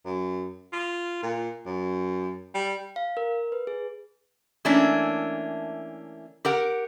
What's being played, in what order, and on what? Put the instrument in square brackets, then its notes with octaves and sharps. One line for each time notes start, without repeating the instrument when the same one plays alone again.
[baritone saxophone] F#2
F4
A#2
F#2
G3
[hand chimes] F5
A#4
B4
G#4
[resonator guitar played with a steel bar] E3 A3 A#3 C#4 D4 E4
G4 A#4 F#5